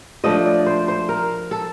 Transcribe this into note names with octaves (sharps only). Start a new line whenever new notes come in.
F3 A3 D4 D#5
D5
C5
C5
A#4
A4